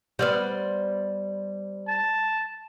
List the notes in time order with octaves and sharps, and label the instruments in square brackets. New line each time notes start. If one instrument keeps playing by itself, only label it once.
[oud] G3 B3 [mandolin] C5 D5 F6
[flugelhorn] A5